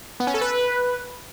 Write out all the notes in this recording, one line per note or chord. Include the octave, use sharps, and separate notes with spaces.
B3
C#4
A4
B4